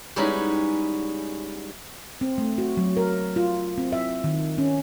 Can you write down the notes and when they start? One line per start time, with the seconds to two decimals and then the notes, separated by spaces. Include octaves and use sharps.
0.16 G3 G#3 B3 C#4 D#4 E4
2.21 C4
2.38 A3
2.58 F#4
2.77 F#3
2.97 A#4
3.36 F4
3.78 C4
3.92 E5
4.24 D#3
4.58 C#4